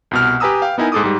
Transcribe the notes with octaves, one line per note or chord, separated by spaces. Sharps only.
C2 B2 F6
G4 B4 G#5 A#5 D#6 E6
F5 G5
B3 D#4 E4 A#4 G#5
G#2 G#4 A4 D6 D#6
G#2 G3